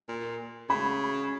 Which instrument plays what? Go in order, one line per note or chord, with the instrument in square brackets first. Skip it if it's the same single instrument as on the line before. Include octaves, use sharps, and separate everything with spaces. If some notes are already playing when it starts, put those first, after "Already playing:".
[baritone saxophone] A#2
[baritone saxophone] C#3 [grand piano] B5